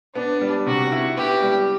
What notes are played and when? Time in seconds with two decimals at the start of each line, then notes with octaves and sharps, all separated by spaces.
0.15 B3 D4
0.41 G3
0.66 C3 F#4
0.92 E4
1.17 B3 G4
1.42 G3